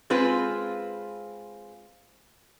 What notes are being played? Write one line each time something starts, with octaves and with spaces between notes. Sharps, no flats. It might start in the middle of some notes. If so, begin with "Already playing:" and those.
G#3 C4 F4 B4